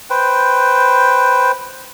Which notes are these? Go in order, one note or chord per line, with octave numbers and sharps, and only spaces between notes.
B4 C5 G5